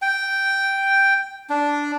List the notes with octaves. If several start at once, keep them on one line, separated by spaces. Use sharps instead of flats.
G5
D4